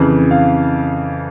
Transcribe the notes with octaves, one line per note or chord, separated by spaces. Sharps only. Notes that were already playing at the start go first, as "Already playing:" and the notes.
Already playing: F2 C#3 E3
F5